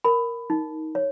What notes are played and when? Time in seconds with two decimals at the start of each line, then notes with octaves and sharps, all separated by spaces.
0.04 A#4 B5
0.50 D#4
0.95 C#5